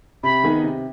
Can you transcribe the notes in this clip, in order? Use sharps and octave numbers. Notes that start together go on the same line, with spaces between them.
C3 B5
D#3 B3 D#4 G#4
C3